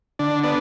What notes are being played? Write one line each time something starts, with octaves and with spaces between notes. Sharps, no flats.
D3 D4
B3 D4